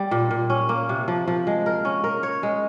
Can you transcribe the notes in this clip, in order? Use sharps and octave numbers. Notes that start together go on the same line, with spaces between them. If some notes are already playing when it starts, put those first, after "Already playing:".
Already playing: G3
A#2
A#2
C#4
A#3
C3
F3
F3
G#3
A#4
C#4
A#4
C#5
G#3